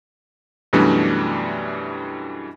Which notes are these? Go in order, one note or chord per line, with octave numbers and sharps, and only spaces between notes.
F#2 B2 E3 G3 A3 D4